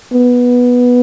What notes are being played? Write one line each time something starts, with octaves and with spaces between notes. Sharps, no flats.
B3